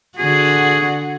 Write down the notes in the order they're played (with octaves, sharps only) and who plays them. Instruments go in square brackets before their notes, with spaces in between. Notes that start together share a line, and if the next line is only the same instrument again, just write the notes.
[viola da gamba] D3 F#4 [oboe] G#4